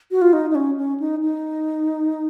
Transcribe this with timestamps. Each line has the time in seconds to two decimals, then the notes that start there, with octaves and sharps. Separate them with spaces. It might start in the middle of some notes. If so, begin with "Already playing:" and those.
0.11 F#4
0.22 F4
0.33 D#4
0.50 D#4
0.55 C#4
0.78 C#4
1.00 D#4
1.22 D#4